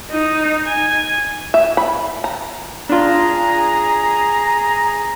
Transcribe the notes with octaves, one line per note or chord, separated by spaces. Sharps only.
D#4
G#5
E5
B5
A#5
D4 F4 G#4 A#5